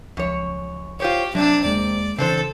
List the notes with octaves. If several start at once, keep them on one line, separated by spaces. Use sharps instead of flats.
C#2 F#2 F3 C#5
F4 G4 C5 C#5
C3 F#3 C4 D4
D#2 G#3 A#3 D5
C#3 E3 C4 D4 A4 C5